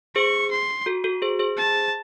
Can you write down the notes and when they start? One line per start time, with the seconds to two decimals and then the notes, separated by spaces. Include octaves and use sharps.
0.15 G#4 C5 C#6
0.51 C6
0.86 F#4 A4
1.04 F#4 A4
1.22 G#4 C5
1.39 G#4 C5
1.57 A5